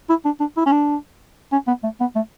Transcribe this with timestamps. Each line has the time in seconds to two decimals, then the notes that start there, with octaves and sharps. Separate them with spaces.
0.09 E4
0.25 D4
0.40 D4
0.57 E4
0.66 C#4
0.72 D4
1.52 C#4
1.67 B3
1.83 A3
2.00 B3
2.15 A3